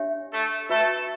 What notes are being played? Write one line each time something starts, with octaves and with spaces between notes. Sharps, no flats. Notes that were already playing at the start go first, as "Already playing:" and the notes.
Already playing: D4 G4 C#5 E5
A3 A4
A3 F#4 A4 B4 E5 B5